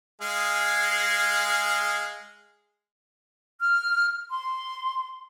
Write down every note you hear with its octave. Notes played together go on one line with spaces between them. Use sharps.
G#3 G#4 F5
F6
C6